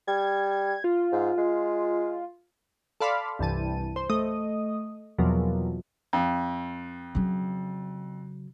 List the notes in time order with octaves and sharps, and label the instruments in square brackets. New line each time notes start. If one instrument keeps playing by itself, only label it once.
[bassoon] G3 [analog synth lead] G#6
[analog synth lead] F4
[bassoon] G#2
G#3
[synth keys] A4 D5 F5 B5 C6 F6
C2 G2 E3 A5 D#7
C5
A3 D#5 D#6
E2 B2 F3 F#3 A#3
[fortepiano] F2
[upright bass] C#3 F#3